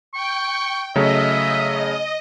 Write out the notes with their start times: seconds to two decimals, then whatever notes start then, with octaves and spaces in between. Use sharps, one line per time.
0.14 G5 C#6
0.96 C#3 F#3 A3 D#5 E5